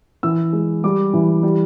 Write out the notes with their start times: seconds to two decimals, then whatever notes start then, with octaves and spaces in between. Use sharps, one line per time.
0.23 E3 E6
0.53 G#3
0.84 G3 D6
1.13 E3
1.43 G3